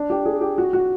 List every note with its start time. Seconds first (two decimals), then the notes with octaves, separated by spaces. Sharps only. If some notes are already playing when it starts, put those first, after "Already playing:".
Already playing: D4
0.10 G4
0.26 G#4
0.41 G4
0.58 F#4
0.73 F#4